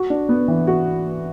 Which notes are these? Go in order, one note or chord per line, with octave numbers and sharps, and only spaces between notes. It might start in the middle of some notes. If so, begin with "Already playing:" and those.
Already playing: F#4
D4
B3
E3
F#4